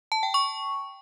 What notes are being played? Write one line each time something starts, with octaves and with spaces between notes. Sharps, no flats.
A5
G5
C#6